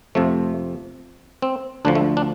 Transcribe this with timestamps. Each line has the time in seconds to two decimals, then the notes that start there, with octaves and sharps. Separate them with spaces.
0.15 F2 C3 F3 A3
1.42 C4
1.85 D2 D3 F3 D4
1.95 A3
2.17 D4